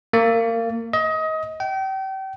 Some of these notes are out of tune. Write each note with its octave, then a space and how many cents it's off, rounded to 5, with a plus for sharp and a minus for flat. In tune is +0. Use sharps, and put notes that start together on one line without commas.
A#3 -25
D#5 +25
G5 -35